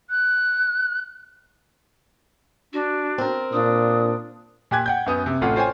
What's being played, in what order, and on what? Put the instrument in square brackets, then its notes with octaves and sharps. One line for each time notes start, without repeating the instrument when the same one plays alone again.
[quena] F#6
[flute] D4 [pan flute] F#4
[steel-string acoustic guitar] C4 A#4
[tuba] A#2 [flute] D4 [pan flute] D#6
[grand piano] A#2 G4 G5 G#5 F#6 G#6
F#5 G5 G6
F#2 B3 D#6
C3
A1 A3 C#4 F4 F#5
F4 C5 C#5 G5 G#5